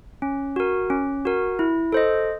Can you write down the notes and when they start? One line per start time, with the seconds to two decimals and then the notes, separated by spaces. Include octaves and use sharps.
0.22 C#4
0.56 F#4 A#4
0.90 C#4
1.25 F#4 A#4
1.59 E4
1.92 A4 C5 D#5